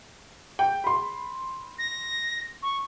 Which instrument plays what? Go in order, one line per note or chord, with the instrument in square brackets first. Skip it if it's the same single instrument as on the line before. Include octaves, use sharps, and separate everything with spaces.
[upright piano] G5
B5 C6
[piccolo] A#6
C#6